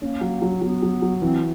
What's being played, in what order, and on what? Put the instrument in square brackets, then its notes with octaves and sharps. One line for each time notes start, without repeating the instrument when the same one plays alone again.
[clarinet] A#3 [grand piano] C#4
[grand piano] F#3
F#3
[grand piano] F#3 [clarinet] B3
[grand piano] F#3
F#3
[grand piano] E3 [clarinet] C4